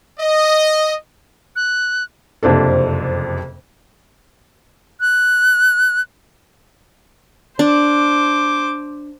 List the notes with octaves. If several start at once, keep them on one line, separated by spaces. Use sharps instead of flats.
D#5
F#6
F#1 F2 C3 D4 A4
F#6
D4 C5 D6